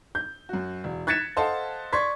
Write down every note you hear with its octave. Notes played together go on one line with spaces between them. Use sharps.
G6
F#2 F#4
E1
F#6 G#6 A6 B6 C#7 E7
A4 C5 D#5 F5 F#5 A5
D5 C6 C#6 G#6 B6